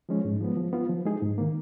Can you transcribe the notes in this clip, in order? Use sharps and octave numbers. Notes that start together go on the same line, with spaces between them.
F3 G#3 C#4
G#2
F3 G#3 B3
F3
B3 F4
F3
G#3 D#4 G#4
G#2
D#3 A#3